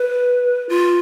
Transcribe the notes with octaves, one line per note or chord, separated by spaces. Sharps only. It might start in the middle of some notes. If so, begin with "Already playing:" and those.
Already playing: B4
F4